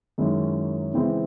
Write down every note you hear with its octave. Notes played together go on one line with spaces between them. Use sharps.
F#2 D#3 G#3 C#4 E4
C#3 E3 G#3 C4 E4